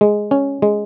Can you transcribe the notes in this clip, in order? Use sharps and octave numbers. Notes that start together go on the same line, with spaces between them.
G#3
C#4
G#3